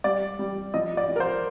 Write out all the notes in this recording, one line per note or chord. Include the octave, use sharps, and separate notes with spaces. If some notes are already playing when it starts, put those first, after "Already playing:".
G3 D5
G3
F3 D#5
D5
F3
A#4
C5